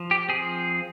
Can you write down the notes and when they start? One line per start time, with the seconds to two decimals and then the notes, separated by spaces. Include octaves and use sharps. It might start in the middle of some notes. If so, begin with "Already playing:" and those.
Already playing: F3
0.11 G4
0.28 F3 C4 G#4